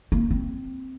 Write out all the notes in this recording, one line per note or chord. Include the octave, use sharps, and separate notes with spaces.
A#3
C4